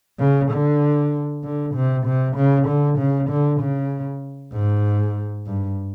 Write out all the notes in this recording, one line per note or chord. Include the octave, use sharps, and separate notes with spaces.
C#3
D3
D3
C3
C3
C#3
D3
C#3
D3
C#3
G#2
G2